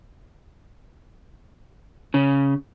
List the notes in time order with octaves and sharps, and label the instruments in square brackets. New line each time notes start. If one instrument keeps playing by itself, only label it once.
[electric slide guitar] C#3